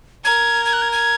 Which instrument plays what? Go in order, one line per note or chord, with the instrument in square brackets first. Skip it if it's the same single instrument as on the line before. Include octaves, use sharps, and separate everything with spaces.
[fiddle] A#4 [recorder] G#6
[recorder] G#6
F#6
G#6
G#6